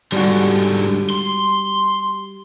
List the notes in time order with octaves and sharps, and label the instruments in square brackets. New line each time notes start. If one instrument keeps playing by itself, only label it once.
[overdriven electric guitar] G#2 D3 [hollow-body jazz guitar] G3 F#4
[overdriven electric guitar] C6